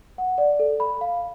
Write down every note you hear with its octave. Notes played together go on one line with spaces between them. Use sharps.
F#5
D5
A4
B5
F5